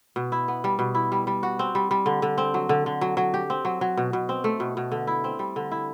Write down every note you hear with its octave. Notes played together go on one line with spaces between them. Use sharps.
B2
E4
B3
G3
B2
E4
G3
G3
F#4
C4
G3
G3
D3
D3
C4
F#3
D3
D3
F#3
F#3
G4
C4
F#3
F#3
B2
B2
C4
A3
B2
B2
D3
E4
C4
G3
D3
E4